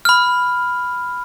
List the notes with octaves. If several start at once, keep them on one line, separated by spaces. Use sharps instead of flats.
B5 F6